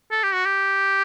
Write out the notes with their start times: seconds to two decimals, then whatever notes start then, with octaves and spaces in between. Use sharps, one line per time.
0.11 A4
0.23 G4
0.34 F#4
0.45 G4